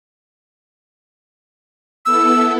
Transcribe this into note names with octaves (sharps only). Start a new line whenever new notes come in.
B3 E4 A4 E6